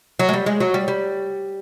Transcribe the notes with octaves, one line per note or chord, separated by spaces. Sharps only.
F#3
G#3
G3
G#3
F#3
G3
G3